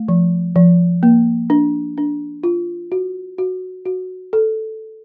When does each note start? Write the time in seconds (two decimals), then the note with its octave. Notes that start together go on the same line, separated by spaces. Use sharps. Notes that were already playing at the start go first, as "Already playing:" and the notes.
Already playing: A3
0.09 F3
0.56 F3
1.03 A#3
1.50 D4
1.98 D4
2.44 F4
2.92 F#4
3.38 F#4
3.86 F#4
4.33 A4